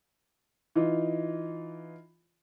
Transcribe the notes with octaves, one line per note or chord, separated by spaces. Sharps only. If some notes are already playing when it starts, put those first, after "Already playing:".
E3 D#4 F4